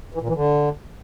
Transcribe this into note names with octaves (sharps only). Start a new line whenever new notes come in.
E3
A#2
E3
D3